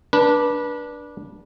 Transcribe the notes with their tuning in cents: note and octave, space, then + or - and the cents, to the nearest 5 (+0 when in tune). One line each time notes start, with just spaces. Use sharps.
D4 +0 B4 -30